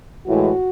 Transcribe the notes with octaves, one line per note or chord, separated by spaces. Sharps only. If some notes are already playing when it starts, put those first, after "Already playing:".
A2 E3 G#3 F#4